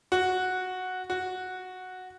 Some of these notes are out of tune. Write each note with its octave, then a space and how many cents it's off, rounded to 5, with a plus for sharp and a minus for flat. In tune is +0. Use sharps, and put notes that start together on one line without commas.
F#4 -5
F#4 -5